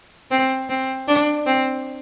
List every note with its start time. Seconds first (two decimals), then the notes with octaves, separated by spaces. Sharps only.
0.31 C4
0.70 C4
1.08 D4
1.46 C4